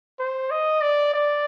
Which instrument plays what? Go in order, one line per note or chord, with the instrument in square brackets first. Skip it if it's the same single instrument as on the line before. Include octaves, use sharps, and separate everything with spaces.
[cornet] C5
D#5
D5
D5